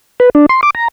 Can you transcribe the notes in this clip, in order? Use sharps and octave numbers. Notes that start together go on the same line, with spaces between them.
B4
D4
C6
D6
A#5